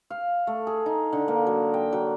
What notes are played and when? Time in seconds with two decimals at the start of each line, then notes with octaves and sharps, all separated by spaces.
0.10 F5
0.47 A3
0.67 G#4
0.86 D#4
1.12 D3
1.28 A#3
1.46 F#3
1.74 G5
1.93 F#3